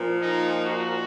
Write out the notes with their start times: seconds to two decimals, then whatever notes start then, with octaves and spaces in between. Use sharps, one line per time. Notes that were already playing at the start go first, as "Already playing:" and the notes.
Already playing: A#2 F3
0.21 D#4
0.64 F#4